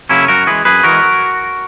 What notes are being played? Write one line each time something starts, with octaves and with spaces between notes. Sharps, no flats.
C#3 F#3 A#3 C#4 E4
F#2 F#4 A#4
E3 G#3 G#4 B4
F#2 G#4 B4
E3 G#3 F#4 A#4